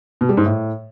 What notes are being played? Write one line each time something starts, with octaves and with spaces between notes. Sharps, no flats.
B2
G3
G#2
A2